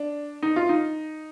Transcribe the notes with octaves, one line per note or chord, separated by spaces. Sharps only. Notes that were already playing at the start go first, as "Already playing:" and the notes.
Already playing: D4
D#4
F4
D#4